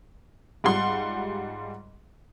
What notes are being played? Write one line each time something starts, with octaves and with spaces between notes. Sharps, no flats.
G#2 G3 F4 F#5 C6